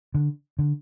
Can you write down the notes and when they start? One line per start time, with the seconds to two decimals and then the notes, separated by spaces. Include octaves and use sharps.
0.14 D3
0.59 D3